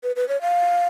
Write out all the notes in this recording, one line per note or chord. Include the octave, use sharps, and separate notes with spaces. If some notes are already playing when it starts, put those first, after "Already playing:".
B4
B4
C#5
F5